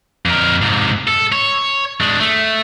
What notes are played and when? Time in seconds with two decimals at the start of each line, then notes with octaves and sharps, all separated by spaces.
0.26 F2 A#4
0.62 G#2 C3
1.07 A4
1.32 C#5
2.01 G#3 D4
2.20 A3